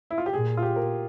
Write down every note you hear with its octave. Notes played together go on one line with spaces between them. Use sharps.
E4
F4
G4
A#2 G#4
F4
G4
A#4